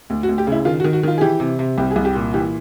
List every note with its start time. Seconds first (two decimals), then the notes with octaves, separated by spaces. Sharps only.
0.10 D2
0.23 F#4
0.29 D2
0.38 G4
0.47 C#3 E4
0.65 D#3 F4
0.80 F#4
0.84 D#3
0.93 F#4
1.03 D#3 F4
1.18 G#4
1.21 E3 G4
1.40 C3
1.59 C3
1.78 C2 G4
1.91 G#4
1.96 C2
2.05 G4
2.15 A#2
2.34 E3 G4